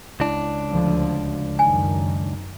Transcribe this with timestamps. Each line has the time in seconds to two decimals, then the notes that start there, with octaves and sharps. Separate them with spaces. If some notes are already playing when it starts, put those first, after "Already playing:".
0.20 C#2 D4 E4
0.70 D2 D3 F3
1.59 F#2 D#3 G#5